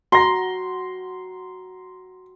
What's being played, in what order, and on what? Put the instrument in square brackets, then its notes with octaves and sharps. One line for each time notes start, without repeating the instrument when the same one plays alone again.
[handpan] F#4 [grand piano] A#5 A#6 [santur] C6